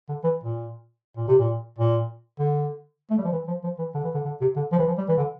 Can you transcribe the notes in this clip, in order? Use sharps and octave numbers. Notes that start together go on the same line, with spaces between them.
D3
E3
A#2
A#2
C3
A#2
A#2
D3
A3
G3
F3
E3
F3
F3
E3
D3
E3
D3
D3
C3
D3
F3
E3
F3
G3
E3
D3